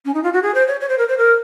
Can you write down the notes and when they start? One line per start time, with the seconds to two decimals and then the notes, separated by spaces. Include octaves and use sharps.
0.05 C#4
0.13 D#4
0.23 F4
0.32 F#4
0.42 G#4
0.54 C5
0.67 C#5
0.80 C#5
0.88 C5
0.98 A#4
1.07 C5
1.17 A#4